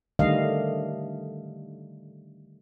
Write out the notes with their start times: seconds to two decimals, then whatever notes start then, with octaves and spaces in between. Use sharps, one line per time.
0.19 D3 D#3 G3 A3 D#5 F5